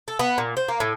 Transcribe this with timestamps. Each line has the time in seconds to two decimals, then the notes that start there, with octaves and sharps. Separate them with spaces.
0.08 A4
0.19 B3
0.38 A#2
0.57 C5
0.68 A#3
0.80 A2